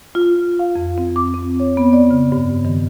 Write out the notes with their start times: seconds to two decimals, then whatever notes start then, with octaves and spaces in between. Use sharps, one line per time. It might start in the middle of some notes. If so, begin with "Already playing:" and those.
0.15 F4
0.59 F5
0.76 F2
0.98 C4
1.16 D6
1.34 C4
1.60 C#5
1.77 B3
1.93 D5
2.11 C#3
2.32 G2
2.65 D#3